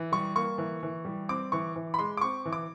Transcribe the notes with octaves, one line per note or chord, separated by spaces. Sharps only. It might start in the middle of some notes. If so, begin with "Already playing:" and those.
Already playing: E3
G3 C#6
A#3 C#6
E3
E3
G3
C4 D6
E3 C#6
E3
B5
G#3 C6
D6
C4 C#6
E3
D6